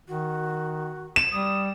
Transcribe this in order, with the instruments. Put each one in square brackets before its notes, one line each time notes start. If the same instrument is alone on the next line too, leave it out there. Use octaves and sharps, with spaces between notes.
[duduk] D#3 [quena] F#4
[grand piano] E7
[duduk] G3 [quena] D#6